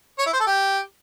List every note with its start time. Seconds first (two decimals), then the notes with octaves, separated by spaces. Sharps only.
0.19 C#5
0.26 E4
0.33 C5
0.40 A4
0.47 G4